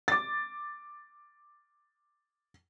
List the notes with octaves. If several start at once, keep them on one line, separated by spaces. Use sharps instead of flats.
D6 A6